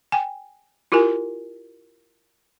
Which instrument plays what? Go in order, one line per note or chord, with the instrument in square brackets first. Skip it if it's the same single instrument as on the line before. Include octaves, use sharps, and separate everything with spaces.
[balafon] G5 G#5
E4 F4 G4 A#4 G#5